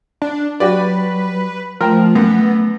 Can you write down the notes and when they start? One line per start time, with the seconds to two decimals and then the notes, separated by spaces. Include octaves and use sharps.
0.22 D4
0.60 F#3 F#4 G4 B4 D5
1.81 F3 A3 A#4 G5
2.15 F#2 B3